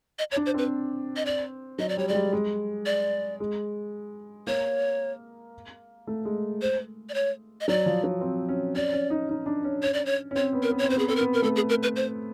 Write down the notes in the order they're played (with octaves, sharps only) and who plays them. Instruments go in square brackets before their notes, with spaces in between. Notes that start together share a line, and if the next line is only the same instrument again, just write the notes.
[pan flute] D#5
C#5
[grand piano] D4
[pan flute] C5
[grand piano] C4 [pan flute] B4
[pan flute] D#5
D5
[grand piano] F#3 [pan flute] D#5
[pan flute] D5
[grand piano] G3 [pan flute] C#5
[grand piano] G#3 [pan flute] D5
[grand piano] G3
G#3
[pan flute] D5
[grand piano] G#3
[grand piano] A#3 [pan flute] C#5
[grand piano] A3
G#3
[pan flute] C5
D5
C#5
D#5
[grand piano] F#3 [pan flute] D5
[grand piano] F3
F#3
C4
C#4
[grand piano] C#4 [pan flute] D5
[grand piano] C#4
D#4
D#4
D4
C#4
[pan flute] C#5
D5
C#5
[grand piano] C#4
[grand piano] C4 [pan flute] C#5
[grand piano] B3
[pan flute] A#4
[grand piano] B3
[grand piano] C4 [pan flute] C#5
[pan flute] C5
[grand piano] B3 [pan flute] G#4
[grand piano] C4 [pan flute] A4
[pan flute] A#4
[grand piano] B3
[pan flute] A#4
[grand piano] A3 [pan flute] A4
[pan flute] G#4
A#4
B4
C5